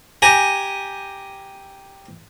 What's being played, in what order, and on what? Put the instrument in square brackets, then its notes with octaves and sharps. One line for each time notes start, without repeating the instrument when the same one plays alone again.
[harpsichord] G4 G#5 A#5